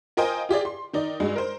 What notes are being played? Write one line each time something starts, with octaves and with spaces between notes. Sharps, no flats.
F4 A#4 C5 D#5 G5 G#5
F4 G4 G#4 D5
C6
D#3 D#4 D5
G2 G#3 F#4
A#4 C5